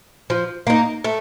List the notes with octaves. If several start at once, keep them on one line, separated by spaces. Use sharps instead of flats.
F3
A#3 D#4
A3